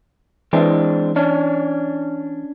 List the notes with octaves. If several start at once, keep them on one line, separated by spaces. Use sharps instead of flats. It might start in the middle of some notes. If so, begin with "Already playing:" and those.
E3 G#3 C4 D4
C#4 D4